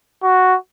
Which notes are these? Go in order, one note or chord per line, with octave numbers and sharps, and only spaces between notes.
F#4